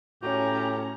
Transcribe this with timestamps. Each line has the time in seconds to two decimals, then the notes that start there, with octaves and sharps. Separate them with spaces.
0.23 A2 C#4 F#4 G4 C#5 A#5